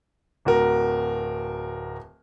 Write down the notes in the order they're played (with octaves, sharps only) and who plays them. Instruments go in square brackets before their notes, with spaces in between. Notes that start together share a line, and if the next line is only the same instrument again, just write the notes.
[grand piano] D1 F#4 A#4